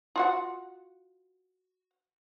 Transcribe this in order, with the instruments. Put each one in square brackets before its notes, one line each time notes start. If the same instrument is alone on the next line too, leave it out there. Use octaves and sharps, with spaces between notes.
[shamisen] F4 F#4 F#5